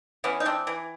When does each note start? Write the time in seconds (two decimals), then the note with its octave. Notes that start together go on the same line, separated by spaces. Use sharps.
0.24 E3 B3 C#4
0.40 D#4
0.45 C4 D4
0.67 E3